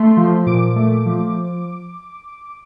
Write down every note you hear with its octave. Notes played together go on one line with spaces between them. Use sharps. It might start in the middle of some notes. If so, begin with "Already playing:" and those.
Already playing: A3 C6
F3
A#2 D6
A3
F3